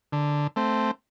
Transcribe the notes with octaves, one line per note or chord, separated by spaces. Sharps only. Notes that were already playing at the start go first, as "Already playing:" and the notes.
D3
A3 C4